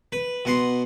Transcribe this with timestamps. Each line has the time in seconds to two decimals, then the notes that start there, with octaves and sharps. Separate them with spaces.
0.12 B4
0.45 B2 F#5 C6